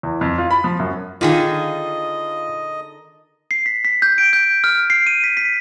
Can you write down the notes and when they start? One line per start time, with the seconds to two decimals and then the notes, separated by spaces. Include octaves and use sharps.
0.03 E2
0.21 F2
0.38 F4
0.51 B5
0.64 F3
0.79 F#2
1.21 D3 D#3 F4 G#4 D#5
3.51 C7
3.66 B6
3.85 B6
4.02 G6
4.18 D7
4.33 G6
4.64 F6
4.90 C7
5.07 D#7
5.24 B6
5.37 B6